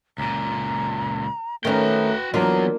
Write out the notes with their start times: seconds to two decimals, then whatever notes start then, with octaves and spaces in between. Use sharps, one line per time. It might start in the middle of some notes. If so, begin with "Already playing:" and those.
0.18 C#2 A#2 A#5
1.65 D#3 A3 C#4 F#4 B4 G5
2.34 E3 F#3 A#3 B3 D4 F4 A#5